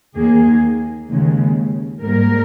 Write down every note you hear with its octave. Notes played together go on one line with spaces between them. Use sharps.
D#2 D#3 A#3 G#4
D#2 C#3 G#3
G#2 G3 A#3 A#4